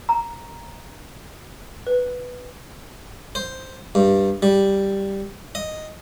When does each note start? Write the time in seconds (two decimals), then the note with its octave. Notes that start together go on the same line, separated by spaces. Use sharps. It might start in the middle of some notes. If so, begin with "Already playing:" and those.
0.09 A#5
1.87 B4
3.35 C5
3.95 G2
4.42 G3
5.55 D#5